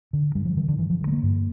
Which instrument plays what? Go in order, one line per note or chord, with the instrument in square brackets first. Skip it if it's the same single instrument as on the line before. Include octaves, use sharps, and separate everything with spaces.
[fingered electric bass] D3
G2 G3
F3
D3 E3
D3
G2 E3
F3
D3
A3
A#3
G2